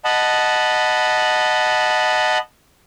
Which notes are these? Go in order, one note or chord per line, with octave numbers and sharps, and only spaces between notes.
D#5 F#5 A5 B5